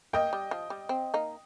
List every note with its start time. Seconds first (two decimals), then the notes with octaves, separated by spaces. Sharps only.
0.13 A#3 D#5 G5
0.33 G3
0.51 F3
0.70 G3
0.89 C4
1.14 A#3 D#4